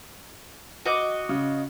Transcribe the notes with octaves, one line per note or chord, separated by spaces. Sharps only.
F#4 D#5 D6
C#3